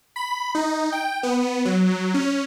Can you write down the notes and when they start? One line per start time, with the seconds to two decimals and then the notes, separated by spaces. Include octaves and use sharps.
0.16 B5
0.55 D#4
0.92 G5
1.23 B3
1.65 F#3
2.14 C#4